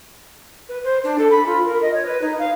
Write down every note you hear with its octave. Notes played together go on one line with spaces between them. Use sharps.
B4
C5
D4
A4
B5
F4
A#4
D#5
C#5
B4
D#4
F5